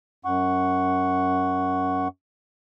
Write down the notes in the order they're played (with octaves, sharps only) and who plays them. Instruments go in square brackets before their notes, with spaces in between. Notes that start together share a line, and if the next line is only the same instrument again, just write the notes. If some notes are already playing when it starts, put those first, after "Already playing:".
[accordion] F#2 F#5 C#6